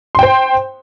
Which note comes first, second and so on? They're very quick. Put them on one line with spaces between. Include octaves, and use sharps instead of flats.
C6 G5 C5